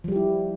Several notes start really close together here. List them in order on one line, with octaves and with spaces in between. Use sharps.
F3 G3 G4 E4